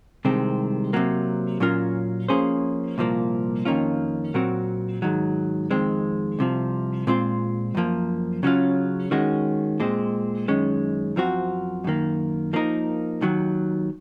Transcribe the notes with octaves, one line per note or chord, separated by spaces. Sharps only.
C2 C3 D#3 G#3 C4
C3 F#3 A#3
A#2 F#3 C#4 F4 A#4
F3 A#3 C#4 G#4 C5
C2 A#2 F3 A#3
F2 D#3 A#3 C#4 F4
A#2 F#3 C4 F#4 A#4
G#2 D#3 F#3
F2 D#3 G#3 C4
C2 C3 F3
A#2 G#3 C4 F4 C5
F#2 F3 A#3
C#3 F#3 C#4 F4
D#3 G#3 C#4 F#4
A#2 G#3 C4
F#2 D#3 G#3 C#4
F#2 F3 C4 F#4
F#2 D#3 A#3
F3 A#3 D#4 A#4
D#2 D#3 F#3